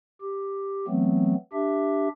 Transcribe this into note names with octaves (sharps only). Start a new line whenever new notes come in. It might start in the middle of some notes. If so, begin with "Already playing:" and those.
G4
E3 F#3 A3 B3 C4
D4 G4 E5